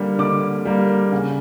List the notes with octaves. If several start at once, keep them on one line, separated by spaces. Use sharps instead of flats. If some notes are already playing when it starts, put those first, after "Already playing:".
Already playing: D3 G3 A#3
D3 D6
G3 A#3
C#3